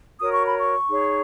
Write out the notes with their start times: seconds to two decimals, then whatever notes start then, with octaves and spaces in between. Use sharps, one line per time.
0.19 F#4 A#4 C#5 D#6
0.32 C#6
0.45 B5
0.59 C#6
0.88 D#4 G#4 C#5